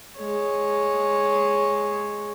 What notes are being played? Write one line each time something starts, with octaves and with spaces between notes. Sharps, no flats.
G#3 C#5